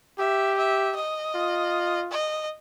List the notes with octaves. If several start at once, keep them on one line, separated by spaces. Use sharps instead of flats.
G4 E5
E5
D#5
F4
D#5